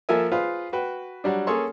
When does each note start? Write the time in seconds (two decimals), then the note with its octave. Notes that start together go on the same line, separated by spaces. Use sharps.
0.09 F3 A#3 A4 A#4 E5 G#5
0.32 F4 G#4 B4 C5 F5
0.73 F#4 B4 G5
1.24 F#3 G3 D4
1.47 A#3 C#4 G#4 A4 C#5 C6